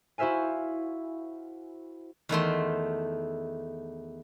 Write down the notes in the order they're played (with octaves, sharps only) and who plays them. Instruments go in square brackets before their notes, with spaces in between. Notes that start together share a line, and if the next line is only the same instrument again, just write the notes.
[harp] E4 F#4 C5 E5 F5 G#5
[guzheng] E2 D#3 A3 C6